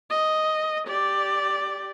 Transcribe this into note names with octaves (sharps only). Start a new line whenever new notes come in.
D#5
G4 D5